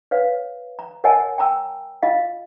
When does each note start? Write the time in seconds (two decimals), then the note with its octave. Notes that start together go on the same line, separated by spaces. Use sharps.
0.11 B4 C#5 F5
0.79 A#5
1.04 A#4 C#5 D#5 F#5 G#5 A5
1.38 G5 A5 A#5 E6
2.03 F4 D#5 F5